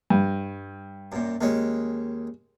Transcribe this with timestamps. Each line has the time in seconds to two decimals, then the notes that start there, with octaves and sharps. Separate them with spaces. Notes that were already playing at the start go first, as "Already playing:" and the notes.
0.10 G2
1.12 F#2 A#2
1.41 D#2 G#3 C#4